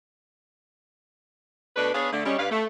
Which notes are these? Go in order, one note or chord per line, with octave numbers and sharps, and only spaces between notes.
B2 A3 D4 B4
B3 D4 G#4 B4 C#5 F5
D3 A3
G3 G#3 C#4
G2 B4 F5
A3